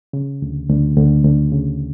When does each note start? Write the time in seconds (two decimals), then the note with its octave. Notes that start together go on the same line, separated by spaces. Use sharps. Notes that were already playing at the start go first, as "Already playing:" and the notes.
0.13 C#3
0.42 D2
0.69 D2
0.97 D2
1.24 D2
1.52 C#3